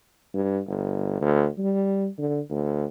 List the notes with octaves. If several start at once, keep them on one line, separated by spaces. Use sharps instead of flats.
G2
G1
D2
G3
D3
D2